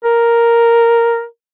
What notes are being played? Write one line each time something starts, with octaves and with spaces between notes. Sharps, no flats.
A#4